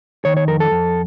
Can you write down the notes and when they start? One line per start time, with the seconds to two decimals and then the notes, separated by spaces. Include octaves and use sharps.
0.25 D#3 C#5
0.37 C#5
0.48 F2 A#4
0.60 A4
0.71 F2